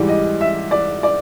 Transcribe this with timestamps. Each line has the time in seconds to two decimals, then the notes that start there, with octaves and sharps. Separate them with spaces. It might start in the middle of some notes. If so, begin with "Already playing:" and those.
Already playing: G#2 E3 G3 D5
0.08 D#5
0.41 E5
0.71 D5
1.03 D5